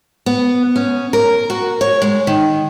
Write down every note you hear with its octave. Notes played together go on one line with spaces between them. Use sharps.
B3
C#4
A#4
F#4
C#5
G#3
D#3